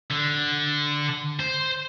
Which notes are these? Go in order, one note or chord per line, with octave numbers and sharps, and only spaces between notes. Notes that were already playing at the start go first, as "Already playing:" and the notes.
D3
C5